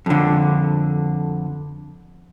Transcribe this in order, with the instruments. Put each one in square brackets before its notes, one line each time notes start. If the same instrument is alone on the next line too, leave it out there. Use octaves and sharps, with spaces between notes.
[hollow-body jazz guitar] F2 D3